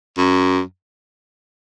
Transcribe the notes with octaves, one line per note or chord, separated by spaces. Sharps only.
F#2